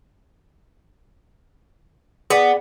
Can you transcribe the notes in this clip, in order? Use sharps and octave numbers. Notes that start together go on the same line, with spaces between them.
B3 G#4 D5